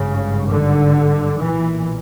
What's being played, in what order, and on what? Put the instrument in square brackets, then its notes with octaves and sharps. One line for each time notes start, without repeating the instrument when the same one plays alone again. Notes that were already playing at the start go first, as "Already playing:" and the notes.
Already playing: [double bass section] G#1 G2 C#3
D3
B1 A#2 E3